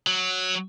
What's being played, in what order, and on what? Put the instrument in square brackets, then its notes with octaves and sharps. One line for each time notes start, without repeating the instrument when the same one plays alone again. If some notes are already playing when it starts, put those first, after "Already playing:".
[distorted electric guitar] F#3